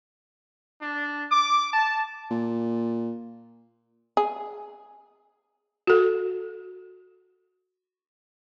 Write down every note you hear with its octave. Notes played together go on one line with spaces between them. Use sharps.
D4
D6
A5
A#2
G#4
F#4 A4